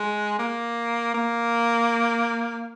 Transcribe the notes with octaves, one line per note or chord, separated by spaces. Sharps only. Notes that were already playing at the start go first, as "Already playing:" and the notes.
Already playing: G#3
A#3
A#3